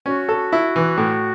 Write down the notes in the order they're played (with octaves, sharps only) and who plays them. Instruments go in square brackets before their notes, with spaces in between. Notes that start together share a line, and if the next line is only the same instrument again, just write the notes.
[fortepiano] C#4 [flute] F#4
[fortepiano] A4
E4
E3
A2